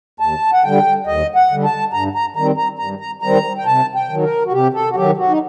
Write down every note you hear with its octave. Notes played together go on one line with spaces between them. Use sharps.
D#2 A5
F#5
D3 G3 G5
D#2 D#5
F#5
D3 G3
A5
G2 A#5
A#5
D#3 G3 C4 A#5
A#5
G2 A#5
A#5
D#3 G3 C4 A#5
G5
C3 A5
G5
D#3 F#3
A#4
F#4
C3 G4
A4
F#4
D#3 F#3 G4
F#4
D#4